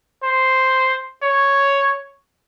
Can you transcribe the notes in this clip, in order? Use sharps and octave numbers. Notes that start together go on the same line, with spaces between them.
C5
C#5